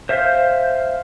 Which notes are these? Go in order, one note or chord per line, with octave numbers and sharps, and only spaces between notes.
C5 E5 F5 G6